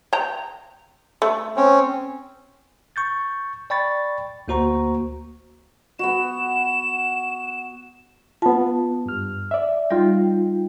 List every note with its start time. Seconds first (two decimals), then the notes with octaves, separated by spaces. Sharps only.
0.13 G5 A#5
1.22 A3
1.56 C4 C#4
2.96 C#6 G6 A6
3.70 D5 G5 B5 C#6 A6
4.48 D2 A#3 F#4 C5 A#5 C#6
5.99 B3 F#4 E7
8.42 B3 F4 A5
9.06 G2 F6
9.51 D5 E5
9.91 G3 D#4 F4 G5